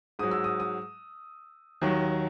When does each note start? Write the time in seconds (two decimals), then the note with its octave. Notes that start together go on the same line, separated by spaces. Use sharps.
0.19 G#2 F#3 D#6
0.31 E6
0.44 D#6
0.60 D#6
1.81 D#2 D#3 F#3